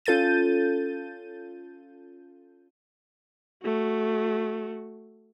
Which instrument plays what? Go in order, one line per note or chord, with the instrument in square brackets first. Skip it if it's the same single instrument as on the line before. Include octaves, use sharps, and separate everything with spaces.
[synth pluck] C#4 F4 A4 G6 A6 D#7
[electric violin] A3 F#4